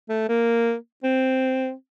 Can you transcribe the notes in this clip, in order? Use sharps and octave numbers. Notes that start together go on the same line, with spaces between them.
A3
A#3
C4